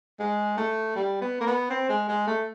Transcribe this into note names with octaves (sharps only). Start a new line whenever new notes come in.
G#3
A3
G3
B3
A#3
B3
C4
G#3
G#3
A3